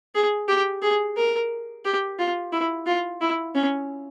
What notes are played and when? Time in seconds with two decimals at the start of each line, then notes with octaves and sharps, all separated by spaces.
0.15 G#4
0.48 G4
0.82 G#4
1.17 A#4
1.85 G4
2.19 F4
2.52 E4
2.86 F4
3.21 E4
3.55 C#4